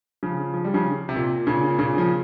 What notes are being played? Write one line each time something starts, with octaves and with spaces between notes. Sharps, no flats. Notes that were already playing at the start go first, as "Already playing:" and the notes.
C#3 F3
F3
G3
C#3 F3
C3
A#2
A#2 C#3
A#2 C#3
F3